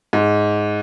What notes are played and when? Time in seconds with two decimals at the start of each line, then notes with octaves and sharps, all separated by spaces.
0.13 G#2